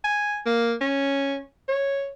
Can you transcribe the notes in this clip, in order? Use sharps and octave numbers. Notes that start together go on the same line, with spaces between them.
G#5
A#3
C#4
C#5